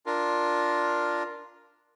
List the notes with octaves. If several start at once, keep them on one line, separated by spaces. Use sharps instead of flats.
D4 F4 A#4